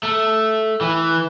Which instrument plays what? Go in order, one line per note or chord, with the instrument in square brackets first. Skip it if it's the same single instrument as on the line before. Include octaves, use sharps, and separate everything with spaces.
[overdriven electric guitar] A3
E3